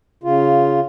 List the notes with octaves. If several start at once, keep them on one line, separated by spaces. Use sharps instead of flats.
C#3 F4